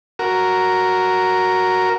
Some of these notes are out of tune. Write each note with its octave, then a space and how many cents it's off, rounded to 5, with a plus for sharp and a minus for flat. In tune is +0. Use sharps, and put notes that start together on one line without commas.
F#4 +0 A#4 +0